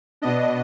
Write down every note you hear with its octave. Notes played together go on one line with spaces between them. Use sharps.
B2 B3 D4 D#5